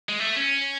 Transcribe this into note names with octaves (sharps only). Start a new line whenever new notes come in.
G#3
A3
C#4